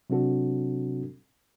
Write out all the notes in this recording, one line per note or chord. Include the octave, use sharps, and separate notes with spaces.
C3 F#3 C4 D4 F#4 A4